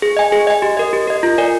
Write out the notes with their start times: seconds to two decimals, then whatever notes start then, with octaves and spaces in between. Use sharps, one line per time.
0.02 G#4
0.17 D#5 G#5
0.32 G#4
0.47 D#5 G#5
0.62 G4
0.77 A#4 D#5
0.93 G4
1.07 A#4 D#5
1.23 F4
1.38 A#4 D5 G#5